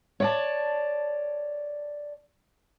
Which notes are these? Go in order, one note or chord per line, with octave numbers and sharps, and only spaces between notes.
C#5 D5 A5